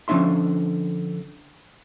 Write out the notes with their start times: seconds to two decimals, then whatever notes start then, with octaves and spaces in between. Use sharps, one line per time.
0.08 D3 F3 C#4 D4 E5 C6